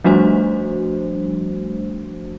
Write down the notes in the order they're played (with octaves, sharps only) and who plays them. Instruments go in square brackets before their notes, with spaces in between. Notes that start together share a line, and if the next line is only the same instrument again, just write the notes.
[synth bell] F3 G3 A3 D4 F#4 C5